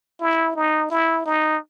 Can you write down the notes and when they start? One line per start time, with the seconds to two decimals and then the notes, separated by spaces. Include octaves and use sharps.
0.21 E4
0.56 D#4
0.91 E4
1.26 D#4